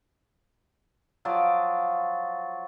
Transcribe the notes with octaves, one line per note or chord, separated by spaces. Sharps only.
F3 F#3 D5